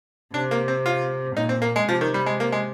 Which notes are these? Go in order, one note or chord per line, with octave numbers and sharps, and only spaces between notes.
C3 D4
A#3
C4
F4
A#2 D#4
C4
A#3
G#3
C3 F3
D#3
G3
G#3
A#3
G#3